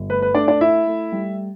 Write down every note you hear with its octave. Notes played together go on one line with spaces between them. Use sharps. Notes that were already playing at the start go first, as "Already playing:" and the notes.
Already playing: G1
A3 B4
B4
A3 D4 D5
D4 D5
E4 E5
A3
G3